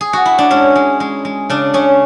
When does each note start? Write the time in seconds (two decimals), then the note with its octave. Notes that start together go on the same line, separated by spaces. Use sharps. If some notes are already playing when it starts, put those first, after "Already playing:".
0.01 G#4
0.13 F#4
0.26 E4
0.38 D4
0.50 G#3 C#4
0.75 G#3
1.00 G#3
1.25 G#3
1.50 C#3 D4
1.74 C#3 C#4